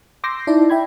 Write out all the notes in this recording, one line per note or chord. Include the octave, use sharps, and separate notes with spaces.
C6 D6 E6 G6 A#6 C7
D#4 E4 D5 A5
E5 G5 B5 G#6